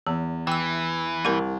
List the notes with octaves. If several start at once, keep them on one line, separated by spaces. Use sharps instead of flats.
E2 E3
E3 G5 E6
C2 E4 G4 A#4